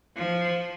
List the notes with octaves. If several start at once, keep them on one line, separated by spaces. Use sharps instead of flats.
F3